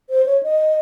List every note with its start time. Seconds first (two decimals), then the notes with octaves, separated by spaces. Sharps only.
0.09 C5
0.26 C#5
0.43 D#5